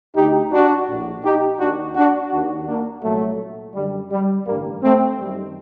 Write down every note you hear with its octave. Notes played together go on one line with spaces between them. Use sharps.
D2 D3 D#4 G4
D4 F#4
A#1 A2
D#4 G4
D#2 D#3 D4 F#4
D4 F#4
D#2 D#3 D4 F#4
A#3 D4
C2 A#2 F#3 A3
F#2 D3 G3
G3
A1 G2 D3 G3 A#3
A3 C4
F#2 D#3 G3